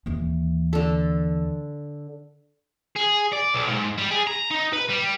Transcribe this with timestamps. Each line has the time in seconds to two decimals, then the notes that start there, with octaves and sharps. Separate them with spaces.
0.06 D#2 E3
0.73 D3 A4
2.96 G#4
3.33 D5
3.54 B1
3.69 G#2
3.98 G3
4.11 G#4
4.27 A#5
4.51 D#4
4.73 B4
4.90 G3